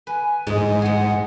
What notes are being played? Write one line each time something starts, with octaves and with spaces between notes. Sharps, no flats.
B4 G#5
G#2 G#3
G#3 G#4 F#5